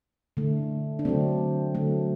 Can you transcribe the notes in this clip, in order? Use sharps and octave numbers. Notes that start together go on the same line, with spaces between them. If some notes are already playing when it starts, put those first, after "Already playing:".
D3 A3
D4
D3 F#3 A3 C4
D3 F#3 A3